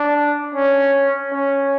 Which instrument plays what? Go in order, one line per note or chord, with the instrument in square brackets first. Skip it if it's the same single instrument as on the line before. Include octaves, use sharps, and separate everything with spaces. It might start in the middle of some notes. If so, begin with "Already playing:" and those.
Already playing: [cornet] D4
C#4
C#4